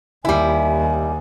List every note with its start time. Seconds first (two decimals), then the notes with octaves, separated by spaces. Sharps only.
0.25 D#2 G3 E4 G#5